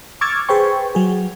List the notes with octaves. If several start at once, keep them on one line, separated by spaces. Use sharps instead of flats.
C#6 D6 E6 F6 G#6 A6
G#4 B4 C5 G5 C#6
F#3 G#4